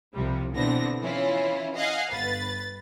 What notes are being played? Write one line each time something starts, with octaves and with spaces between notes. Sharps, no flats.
C2 C3 F3 G3
B2 D3 E3 B3 C4 A#6
E3 C#4 E4 F4
D#5 F5 F#5 G#5
G1 B4 A6